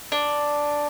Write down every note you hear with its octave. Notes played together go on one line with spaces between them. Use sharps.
D4